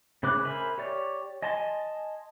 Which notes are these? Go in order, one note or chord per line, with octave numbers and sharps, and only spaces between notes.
C#3 E4 C5 D6 F#6
A#4 C5 E5 G#5 B5
G4 C#5 D5
D#5 G#5 A5 C6